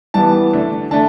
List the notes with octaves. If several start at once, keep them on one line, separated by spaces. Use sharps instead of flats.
E3 G3 B3 A5
D3 A3 D4
A3 D4 A5